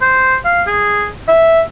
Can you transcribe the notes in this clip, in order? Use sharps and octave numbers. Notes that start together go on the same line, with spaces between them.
C5
F5
G#4
E5